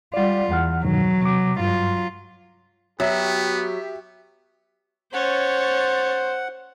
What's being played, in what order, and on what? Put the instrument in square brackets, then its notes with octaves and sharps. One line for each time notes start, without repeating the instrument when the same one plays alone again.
[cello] G3 F4 [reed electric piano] D5 F#5
[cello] E2 [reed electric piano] F#5 F6
[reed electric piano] G2 B2 D#3 [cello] F#3
[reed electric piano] C3 D6
[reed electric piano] G2 [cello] F#3 F4
[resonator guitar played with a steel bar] F#3 [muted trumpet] B3 [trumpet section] G4 [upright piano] E5
[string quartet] C#4 C#5 A6 [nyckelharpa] C5 [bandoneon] F#5